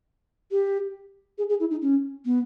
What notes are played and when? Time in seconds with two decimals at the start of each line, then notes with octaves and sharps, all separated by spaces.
0.51 G4
1.38 G#4
1.50 G#4
1.60 E4
1.71 D#4
1.82 C#4
2.25 B3